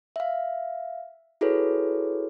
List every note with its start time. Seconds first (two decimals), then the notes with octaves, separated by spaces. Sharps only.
0.16 E5 F5
1.41 E4 F#4 G#4 A4 B4 C#5